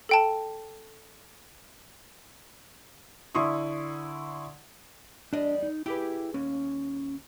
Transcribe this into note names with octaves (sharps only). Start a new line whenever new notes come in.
A4 G5 A5
D3 E4 C6 C#6 D#6
E2 G3 D4 D#5
D#4
E4 G4 G#4 B4 G5
D#2 C#4